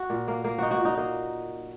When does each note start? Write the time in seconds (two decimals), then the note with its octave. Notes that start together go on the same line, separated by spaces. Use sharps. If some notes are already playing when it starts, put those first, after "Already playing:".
Already playing: F#4
0.10 A#2
0.28 A#3
0.44 A#3
0.58 D#4 F#4
0.71 F#4
0.80 A#2
0.85 D#4
0.97 A#3 D#4